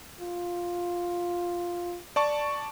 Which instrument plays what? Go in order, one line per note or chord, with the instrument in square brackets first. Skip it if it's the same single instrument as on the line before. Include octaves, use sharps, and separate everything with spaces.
[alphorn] F4
[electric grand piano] D5 A5 C#6